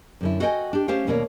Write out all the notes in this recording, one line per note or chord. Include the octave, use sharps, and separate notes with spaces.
F#2 D3 E4
F#4 A4 D#5 F5 G5 G#5
D4 G4
A3 C#4 G4 C5 F5 G5
D#2 B2 A3 A#3 C#5 D5